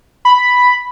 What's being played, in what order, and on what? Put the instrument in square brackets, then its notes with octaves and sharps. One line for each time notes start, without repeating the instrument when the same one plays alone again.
[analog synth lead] B5